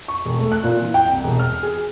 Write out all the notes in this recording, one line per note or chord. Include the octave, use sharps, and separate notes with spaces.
C#6
E1
A3
F#6
A#2
E3
G5
C2
E1
F6
G#4